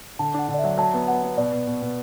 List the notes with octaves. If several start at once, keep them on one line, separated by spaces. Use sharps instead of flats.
D3 A5
D4 F#5
D3
D5
E5
F#3
F#3 A5
B3
B3 F#5
B3
B2 D5
B2
B2
B2